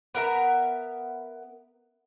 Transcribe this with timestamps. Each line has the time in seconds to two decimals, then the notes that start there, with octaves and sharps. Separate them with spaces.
0.15 B3 A#4 E5 A#5